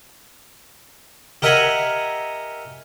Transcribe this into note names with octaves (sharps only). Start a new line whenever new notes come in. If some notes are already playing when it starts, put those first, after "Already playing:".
G4 A#4 D#5 E5 F#5 G#5